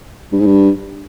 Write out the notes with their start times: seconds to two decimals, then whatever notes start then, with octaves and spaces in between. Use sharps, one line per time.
0.32 G2
0.40 G#2
0.46 G2